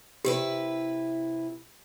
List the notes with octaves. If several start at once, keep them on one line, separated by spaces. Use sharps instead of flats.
C3 E4 G4 B4